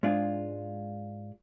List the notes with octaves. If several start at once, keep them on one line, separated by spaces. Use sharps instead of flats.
G#2 G#3 D4 F4 G#4